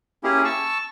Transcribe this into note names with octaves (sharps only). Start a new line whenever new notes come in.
A#3 C#4 E4 G4 G#4
A5 C#6 E6